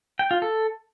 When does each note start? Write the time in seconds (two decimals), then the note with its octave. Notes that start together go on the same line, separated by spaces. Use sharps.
0.19 G5
0.31 F4
0.42 A4